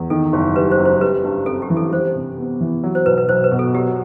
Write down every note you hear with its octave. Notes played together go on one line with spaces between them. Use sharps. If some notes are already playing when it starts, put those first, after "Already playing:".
Already playing: E2
D#3 A4
F#1
G3 B4
C5
F#2
C5
G3 B4
G2
C4 A4
G4
E3
A4
G3 C5
C3
B3
E3
F#3
C5
B1 B4
B4
B1 C5
B4
B2
A4
F#3 G4